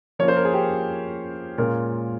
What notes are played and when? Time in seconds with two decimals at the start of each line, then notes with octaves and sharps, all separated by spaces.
0.19 F3 A#3 C#4 F4 C#5
0.28 C5
0.37 A#4
0.45 G#4
0.54 G4
1.58 A#2 G#3 C#4 F4 A#4